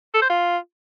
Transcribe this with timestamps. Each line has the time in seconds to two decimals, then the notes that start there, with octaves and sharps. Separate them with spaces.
0.14 A4
0.22 C5
0.30 F4